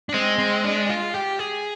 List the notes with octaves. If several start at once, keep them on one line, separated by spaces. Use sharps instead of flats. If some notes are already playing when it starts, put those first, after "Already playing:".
D4
G#3 C4
C4
D4
F4
G4
G#4